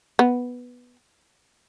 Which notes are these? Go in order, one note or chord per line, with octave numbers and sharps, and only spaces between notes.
B3